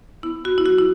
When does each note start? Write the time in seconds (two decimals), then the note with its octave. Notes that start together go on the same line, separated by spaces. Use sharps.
0.23 B3 E4
0.44 B3 F#4
0.58 E4
0.66 F#3 F#4
0.79 E4